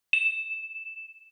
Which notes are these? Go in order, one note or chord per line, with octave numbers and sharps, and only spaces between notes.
E7